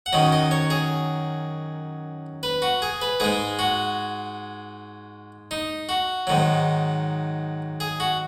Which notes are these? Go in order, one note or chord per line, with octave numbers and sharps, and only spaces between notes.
F#5
F#2 D#3 F#3 D#5
D#5
C#5
G#4
B4
F#4
G#4
B4
G#2 G#3 G#4
F#4
D#4
F#4
G#2 D#3 F#3
G#4
F#4